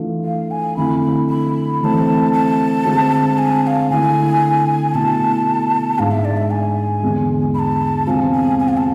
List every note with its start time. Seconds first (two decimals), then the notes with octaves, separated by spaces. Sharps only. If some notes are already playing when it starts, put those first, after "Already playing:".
Already playing: E3 A3 D4 F4
0.25 F5
0.51 G#5
0.77 F2 D3 A3 E4 B5
1.03 B5
1.29 B5
1.55 B5
1.81 E3 B5
1.84 A3 C4 A5
2.33 A5
2.85 D3 G#3 C4 F4
3.38 G#5
3.63 G#5
3.67 F5
3.90 D3 A3 E4 G#5
4.94 B2 A3 E4 A5
5.98 G#2 G#3 D4 F5
6.11 E5
6.25 D5
6.37 E5
6.51 G#5
7.03 E2 D3 G#3
7.54 B5
7.59 A5
8.06 E2 C3 G#3 C4 F4 G#5 A5
8.33 G#5
8.59 G#5
8.69 F5
8.77 A5